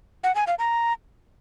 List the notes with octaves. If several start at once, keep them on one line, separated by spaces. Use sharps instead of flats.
F#5
G#5
F5
A#5